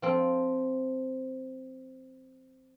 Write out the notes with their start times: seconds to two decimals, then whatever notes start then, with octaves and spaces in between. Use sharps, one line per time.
0.02 F3 C4